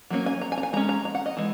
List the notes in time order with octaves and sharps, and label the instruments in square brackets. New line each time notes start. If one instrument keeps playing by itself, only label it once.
[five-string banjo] F#3 A#3 C#4
G#5
A#5
G#5
A#5
G#5
G#3 C#4 A#5
A#5
A#5
F#5
D#5
E3 G#3